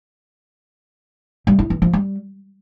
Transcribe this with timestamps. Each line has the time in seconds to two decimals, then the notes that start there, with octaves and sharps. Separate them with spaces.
1.47 G3
1.59 E4
1.70 E3
1.82 F3
1.93 G3